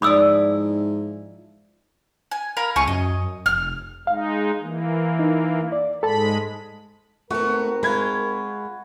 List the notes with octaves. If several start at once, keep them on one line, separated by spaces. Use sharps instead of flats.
G#2 F3 E4 D5 B5 D#6 E6
G#5
A#4 F5 B5
C#2 A3 G#4 C#6
F#2 D#5
F1 F6
G#3 D#4 F5
E3 A#3
D#4
D5
G#2 G#3 A4 A5 B5
G#2 A3 B3 C4 F#4 A#4
G#3 F4 B5 G#6